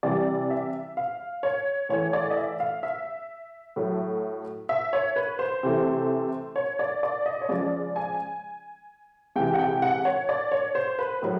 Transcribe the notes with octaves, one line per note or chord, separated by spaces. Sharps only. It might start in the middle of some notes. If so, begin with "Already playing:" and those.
C3 E3 G3 D5
E5
F5
C#5
A2 E3 A3 C#5
D5
D#5
E5
F5
E5
A2 F#3 A3
E5
C#5
B4
C5
C3 E3 A3
C#5
D5
D5
D#5
C#5
C#3 F3 G#3 D5
G#5
C3 E3 G#3 G5
F#5
G5
F#5
C#5
D5
C#5
C5
B4
A2 F#3 B4